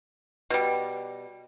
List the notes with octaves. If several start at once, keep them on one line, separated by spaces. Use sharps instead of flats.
B2 G3